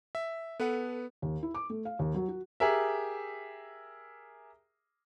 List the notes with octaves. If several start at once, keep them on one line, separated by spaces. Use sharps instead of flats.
E5
B3 A4 B4 F#5
D#2
E4
D6
A3
F5
D#2
F#3
F#4
G4 G#4 A#4 E5